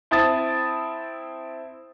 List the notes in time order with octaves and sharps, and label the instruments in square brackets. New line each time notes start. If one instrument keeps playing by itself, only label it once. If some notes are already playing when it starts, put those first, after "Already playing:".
[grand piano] C4 E4 A5 D#6 A6